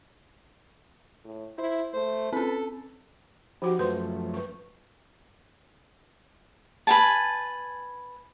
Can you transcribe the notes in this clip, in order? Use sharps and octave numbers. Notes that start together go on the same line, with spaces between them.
A2
E4 C5
A3 C5
C4 C#4 A4 B4
F3 D#4 F#4 G4 F#5
F#2 F3 A3 B4 C5 C6
B4 C#6
B4 G#5 A5